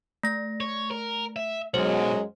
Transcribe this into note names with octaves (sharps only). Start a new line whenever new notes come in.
A3 A#6
C#5
A#4
E5
B1 F#2 F#3 G#3 C5